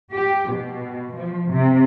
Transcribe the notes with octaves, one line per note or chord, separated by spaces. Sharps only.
G4
B2
F3
C3